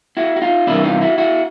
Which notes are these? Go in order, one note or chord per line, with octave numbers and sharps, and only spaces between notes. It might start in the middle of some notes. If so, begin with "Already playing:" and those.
E4 F#4
F#4
D#4 F4
C3 E3 G3 A#3 D4 E4
D#4 F4
E4 F#4
E4 F#4